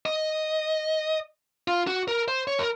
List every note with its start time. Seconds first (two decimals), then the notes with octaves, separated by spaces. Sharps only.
0.06 D#5
1.68 F4
1.87 F#4
2.08 A#4
2.28 C5
2.47 C#5
2.59 A#4